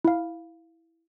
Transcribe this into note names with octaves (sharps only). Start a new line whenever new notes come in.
E4 F5